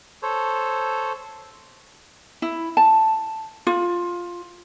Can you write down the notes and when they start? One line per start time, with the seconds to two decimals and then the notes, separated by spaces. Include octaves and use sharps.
0.23 A4 C5 C#5
2.42 E4
2.77 A5
3.67 F4